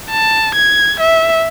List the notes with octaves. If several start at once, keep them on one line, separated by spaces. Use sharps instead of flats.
A5
G#6
E5